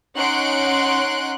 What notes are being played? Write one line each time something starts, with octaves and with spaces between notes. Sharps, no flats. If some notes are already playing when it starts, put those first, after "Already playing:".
C#4 D#4 F#5 C6 F#6 D7